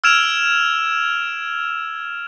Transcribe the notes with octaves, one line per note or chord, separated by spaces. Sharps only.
E6 F6 G#6 D7 E7 F7